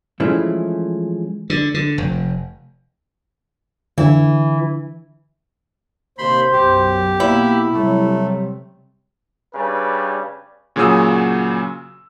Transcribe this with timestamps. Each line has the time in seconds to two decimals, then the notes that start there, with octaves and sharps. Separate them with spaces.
0.20 E3 F3 G#3 A3 C#4 E4
1.50 D3
1.74 D3
1.98 F1
3.98 D3 E3
6.18 D#2 C3 C5 B5 C6
6.53 B1 F#2 G4
7.20 B2 A#3 E4
7.73 C3 F#3 G3 A3
9.54 C#3 G3 D4 B4
10.76 A#2 C#3 F#3 F#4 D#6 E6